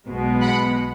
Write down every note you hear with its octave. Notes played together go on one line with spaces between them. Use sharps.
B1 B2 G#3 B3
F#5 B5